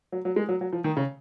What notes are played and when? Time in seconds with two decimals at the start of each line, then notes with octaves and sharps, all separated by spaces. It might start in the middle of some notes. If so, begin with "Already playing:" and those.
0.12 F#3
0.25 F#3
0.36 G#3
0.49 F#3
0.61 F#3
0.73 F3
0.84 D#3
0.97 C#3